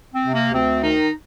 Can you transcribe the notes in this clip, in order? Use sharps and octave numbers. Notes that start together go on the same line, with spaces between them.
C4
C3
A#3
D2 C4
D#3 D#4